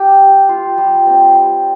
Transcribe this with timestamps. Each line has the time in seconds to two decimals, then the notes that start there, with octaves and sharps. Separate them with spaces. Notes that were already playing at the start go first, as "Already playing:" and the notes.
Already playing: G4
0.21 G3
0.49 F4
0.78 G3
1.06 C4
1.35 G3